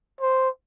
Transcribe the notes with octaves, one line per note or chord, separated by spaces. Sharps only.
C5